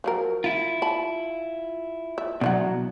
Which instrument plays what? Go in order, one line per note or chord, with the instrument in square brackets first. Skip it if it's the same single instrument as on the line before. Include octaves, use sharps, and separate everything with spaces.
[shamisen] F3 F#3 A#4
[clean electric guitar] E4 F4
[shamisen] A5 B5
E5
[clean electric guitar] B2 F#3 [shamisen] D3 E3 F#5